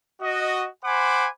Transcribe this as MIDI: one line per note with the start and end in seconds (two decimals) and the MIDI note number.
0.22 0.66 66
0.22 0.66 75
0.85 1.28 72
0.85 1.28 78
0.85 1.28 80
0.85 1.28 83
0.85 1.28 86